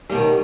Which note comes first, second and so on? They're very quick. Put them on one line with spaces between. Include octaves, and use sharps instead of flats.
G3 B2 D#3